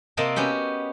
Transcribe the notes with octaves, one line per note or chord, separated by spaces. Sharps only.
C3 A#3 C4 D#5 A5
B3 C#4 F#4 G4